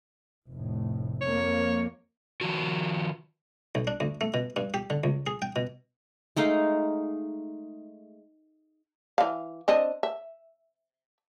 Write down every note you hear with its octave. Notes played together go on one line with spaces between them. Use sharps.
F1 A2
F2 A#3 C#5
D#3 F3 F#4
B1
D4
D2
A3
B2
G2
G4
D3
C#2
G#4
G5
B2
G#3 A3 D#4 F5
E3 F5
C4 D4 D#5
E5